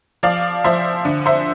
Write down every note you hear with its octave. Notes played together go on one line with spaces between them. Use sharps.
F3 D5 F5
F3 C5 E5
D3
C5 E5